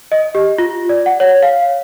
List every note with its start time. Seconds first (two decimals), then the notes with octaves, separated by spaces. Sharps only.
0.12 D#5
0.35 G4
0.58 F4
0.89 D5
1.06 F#5
1.20 C#5
1.43 F5